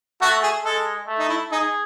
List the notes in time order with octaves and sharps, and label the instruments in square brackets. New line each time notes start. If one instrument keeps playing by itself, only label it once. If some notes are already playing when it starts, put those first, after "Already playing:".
[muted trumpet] A3 [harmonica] F#4
[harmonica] G#4
[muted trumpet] G#3 [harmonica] A4
[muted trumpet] A3
[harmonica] D#4
E4
[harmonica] D#4 [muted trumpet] G#4